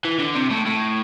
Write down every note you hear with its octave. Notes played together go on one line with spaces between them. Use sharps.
E3
D3
C3
A2
A2